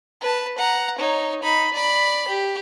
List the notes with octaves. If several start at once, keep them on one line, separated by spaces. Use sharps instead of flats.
B4 A5
F#5 A#5
D#4 C#5
D#4 B5
D5 B5
G4